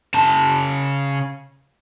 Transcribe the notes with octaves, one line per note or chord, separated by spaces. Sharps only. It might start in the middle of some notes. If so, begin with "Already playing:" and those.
C#3 A5